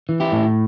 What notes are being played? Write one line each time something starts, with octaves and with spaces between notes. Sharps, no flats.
E3
E4 G4
A2